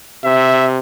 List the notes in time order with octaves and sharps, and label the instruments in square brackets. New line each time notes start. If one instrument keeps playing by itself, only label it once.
[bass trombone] C3 [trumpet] E5